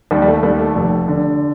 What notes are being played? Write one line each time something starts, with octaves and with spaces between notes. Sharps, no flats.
D#2 G3
G3
A3
D#2 G3
A3
F1
D3